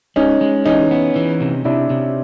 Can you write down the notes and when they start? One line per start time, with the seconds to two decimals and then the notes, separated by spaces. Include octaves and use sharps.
0.16 G#3 C#4 D#4
0.41 G#3
0.65 E3 C#4 D#4
0.91 B3
1.16 E3
1.40 C3
1.65 C3 D4 E4
1.90 C3